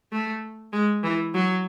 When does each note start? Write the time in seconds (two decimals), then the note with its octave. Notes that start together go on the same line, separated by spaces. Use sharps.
0.12 A3
0.72 G#3
1.03 E3
1.34 F#3